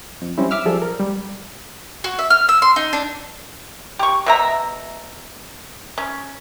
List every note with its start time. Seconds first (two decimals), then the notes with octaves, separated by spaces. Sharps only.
0.22 F2
0.38 G3 C4 C#4 E4
0.51 E5 D6 E6 F6
0.65 F3 G3 G#4 A4
0.82 A#4
1.00 G3
2.04 F#4
2.19 E5
2.30 F6
2.49 E6
2.62 C6
2.76 D#4
2.93 D4
3.99 G4 C#6
4.26 B2 E5 A#5
5.98 C#4